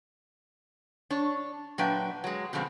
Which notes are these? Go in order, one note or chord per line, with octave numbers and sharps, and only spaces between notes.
D4 C#5
A#2 F#3 D4 B4 E5 G5
F#3 G#3
B2 D3 F3 G#3 C4